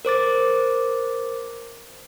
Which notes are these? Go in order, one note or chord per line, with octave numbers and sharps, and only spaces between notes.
A#4 C5 D6 A6